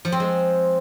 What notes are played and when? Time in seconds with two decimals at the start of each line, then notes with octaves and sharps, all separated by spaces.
0.05 F3
0.12 C4
0.20 G#3